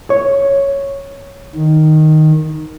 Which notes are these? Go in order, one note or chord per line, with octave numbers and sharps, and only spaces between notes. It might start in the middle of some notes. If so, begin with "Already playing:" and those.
C#5
D#3